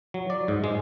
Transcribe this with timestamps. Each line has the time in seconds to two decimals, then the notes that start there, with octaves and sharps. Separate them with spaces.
0.14 F#3
0.30 D5
0.48 G#2
0.64 G#3